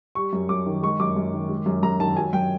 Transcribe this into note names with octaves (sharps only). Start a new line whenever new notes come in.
G3 C#6
F#2
F#2 D6
D#3
G#3 C#6
F#2 D6
F#2
D#3
G#3
F#2
F#2 A#5
D#3 A5
F#3 G#5
F#2 G5